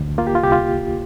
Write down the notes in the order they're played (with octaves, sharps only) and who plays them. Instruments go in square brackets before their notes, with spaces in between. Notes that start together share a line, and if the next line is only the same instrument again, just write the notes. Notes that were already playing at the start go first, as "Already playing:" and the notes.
Already playing: [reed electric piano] D2
A#3 F4
G4
F4
C2 G4
F4